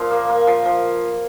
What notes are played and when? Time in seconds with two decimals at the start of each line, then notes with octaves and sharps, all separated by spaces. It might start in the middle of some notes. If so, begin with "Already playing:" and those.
Already playing: A#2 F3
0.11 A#3
0.29 A#3
0.47 F3
0.65 F3